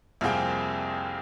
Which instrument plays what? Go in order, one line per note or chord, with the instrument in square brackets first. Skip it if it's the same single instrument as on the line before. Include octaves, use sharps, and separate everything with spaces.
[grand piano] C2 F2 A#3 C4 G#4 G5